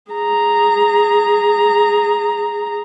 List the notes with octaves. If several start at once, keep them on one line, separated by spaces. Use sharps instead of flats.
G#4 A#5